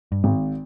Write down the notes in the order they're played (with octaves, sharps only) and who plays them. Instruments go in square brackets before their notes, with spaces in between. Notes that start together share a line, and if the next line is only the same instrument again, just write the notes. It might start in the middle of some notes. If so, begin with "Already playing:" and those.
[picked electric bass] G2
[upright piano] G#1 [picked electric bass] G#2